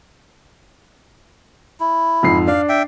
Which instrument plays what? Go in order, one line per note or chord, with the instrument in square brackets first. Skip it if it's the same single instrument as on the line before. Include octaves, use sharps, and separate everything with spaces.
[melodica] E4
[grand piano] F2 G#2 C7
[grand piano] D4 [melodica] F5
[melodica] E5 G5